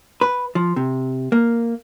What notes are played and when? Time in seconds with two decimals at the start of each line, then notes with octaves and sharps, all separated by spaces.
0.21 B4
0.55 F3
0.76 C3
1.32 A#3